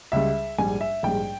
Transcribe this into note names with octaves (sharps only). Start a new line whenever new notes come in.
C#2 C#3 G3 E5
A#1 G#2 G3 G#5
E5
A#1 G#2 G3 G5